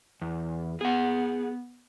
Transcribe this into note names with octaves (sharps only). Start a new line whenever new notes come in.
E2
B3 G#4 F#5